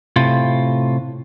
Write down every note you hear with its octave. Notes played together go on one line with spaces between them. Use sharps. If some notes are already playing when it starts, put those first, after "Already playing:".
A2 C3 F4